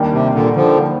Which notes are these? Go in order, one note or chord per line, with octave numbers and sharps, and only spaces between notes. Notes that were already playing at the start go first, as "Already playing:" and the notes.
Already playing: D#2 D#3 G3 D4
C3
A#2 D3
D3 F3